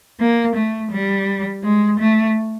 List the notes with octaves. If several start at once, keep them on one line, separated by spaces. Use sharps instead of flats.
A#3
A3
G3
G#3
A3